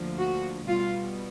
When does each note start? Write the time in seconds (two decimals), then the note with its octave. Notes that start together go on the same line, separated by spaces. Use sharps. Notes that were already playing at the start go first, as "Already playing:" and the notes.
Already playing: D2 D3 F3 A#3
0.18 F#4
0.66 B2 G3 B3 F4